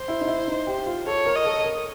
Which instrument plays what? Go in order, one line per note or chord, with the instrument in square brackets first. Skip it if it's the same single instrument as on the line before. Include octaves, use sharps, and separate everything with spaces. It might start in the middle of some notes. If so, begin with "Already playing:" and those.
Already playing: [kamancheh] C5
[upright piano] E4
D#4
E4
D#4
G4
F4
[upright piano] A4 [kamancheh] C#5
[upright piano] A#4
[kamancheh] D#5
[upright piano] A4
A#4